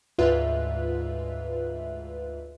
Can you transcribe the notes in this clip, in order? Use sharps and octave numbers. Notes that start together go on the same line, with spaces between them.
D2 G#2 F4 B4 E5 F#6